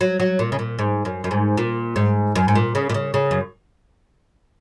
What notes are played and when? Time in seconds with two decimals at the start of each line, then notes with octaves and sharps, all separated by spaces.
0.01 F#3
0.20 F#3
0.39 A#2
0.52 C#3
0.59 A#2
0.79 G#2
1.05 F#2
1.24 F#2
1.31 G#2
1.58 A#2
1.96 G#2
2.36 F#2
2.48 G#2
2.55 A#2
2.75 C#3
2.90 A#2
2.94 C#3
3.14 C#3
3.31 F#2